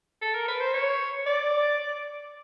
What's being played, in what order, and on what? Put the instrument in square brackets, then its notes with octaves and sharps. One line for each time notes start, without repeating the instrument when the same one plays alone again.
[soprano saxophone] A4
A#4
B4
C5
C#5
D5